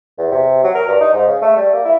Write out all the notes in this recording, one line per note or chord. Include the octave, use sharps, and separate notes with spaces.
E2
C3
F#3
A#4
G2
D#4
G#2
C#3
A3
G3
A#3
E4